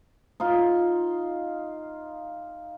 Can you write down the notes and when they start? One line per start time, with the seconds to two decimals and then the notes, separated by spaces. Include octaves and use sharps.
0.40 D#4 F4